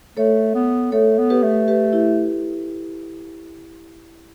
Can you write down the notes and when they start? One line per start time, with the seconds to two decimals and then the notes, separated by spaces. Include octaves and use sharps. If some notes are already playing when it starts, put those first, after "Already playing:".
0.17 A3 A4 C#5
0.55 B3
0.92 A3 A4 C#5
1.18 B3
1.30 G4 B4
1.43 A3
1.68 G4 B4
1.93 E4 G4